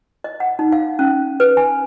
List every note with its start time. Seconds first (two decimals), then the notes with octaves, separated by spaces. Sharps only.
0.24 D#5
0.40 F#5
0.59 D#4
0.72 F5
0.99 C#4
1.40 B4
1.57 G#5